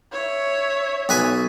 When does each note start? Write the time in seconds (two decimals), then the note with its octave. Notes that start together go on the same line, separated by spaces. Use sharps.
0.13 C#5 E5
1.09 B1 B4 G#5